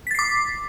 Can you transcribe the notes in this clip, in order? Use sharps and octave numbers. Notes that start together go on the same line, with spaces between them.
D6 A6 B6 C7